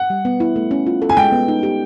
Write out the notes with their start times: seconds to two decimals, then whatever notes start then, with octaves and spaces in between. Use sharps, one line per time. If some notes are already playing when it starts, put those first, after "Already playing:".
Already playing: F#5
0.10 G3
0.25 B3
0.40 E4
0.56 A3
0.71 C#4
0.86 F4
1.02 A4
1.09 G#5
1.17 G#3 G5
1.32 B3
1.48 D#4
1.63 G4